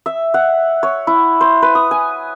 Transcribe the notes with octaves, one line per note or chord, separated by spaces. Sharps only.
E5
F#5
C#5
E4
C5
B4
D#6
G#5